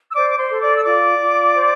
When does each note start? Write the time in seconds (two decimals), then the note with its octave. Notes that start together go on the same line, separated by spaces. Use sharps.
0.11 E6
0.15 C5 D5 D6
0.30 D6
0.38 C5 C6
0.51 A4
0.61 D5 D6
0.76 E6
0.84 F4 D5 D6
1.19 F4
1.55 C5